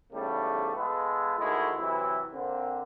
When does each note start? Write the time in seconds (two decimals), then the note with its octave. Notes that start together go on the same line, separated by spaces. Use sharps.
0.13 E2 G#2 C#3 G3 A3
0.76 G#3 B3 F4 A4 B4
1.39 D2 D#3 G#3 A3 E4
1.77 C3 E3 F#3 E4
2.33 D3 A#3 C4